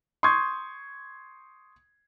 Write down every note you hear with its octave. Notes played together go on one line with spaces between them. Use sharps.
C6 C#6 D#6 G6 G#6